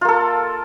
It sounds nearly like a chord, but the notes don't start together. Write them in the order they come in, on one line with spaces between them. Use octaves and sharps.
F4 A#3 A4